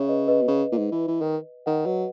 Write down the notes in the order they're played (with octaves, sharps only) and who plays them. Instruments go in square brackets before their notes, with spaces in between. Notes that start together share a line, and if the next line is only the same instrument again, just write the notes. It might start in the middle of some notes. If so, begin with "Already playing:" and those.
Already playing: [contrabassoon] C#3 [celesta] C#5 E5
[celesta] B4 D#5
B4 D#5
[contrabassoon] B2
C#3
A#2
G#2
E3
E3
D#3
[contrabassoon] D#3 [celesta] D#5 F#5
[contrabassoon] F#3 [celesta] B4 D#5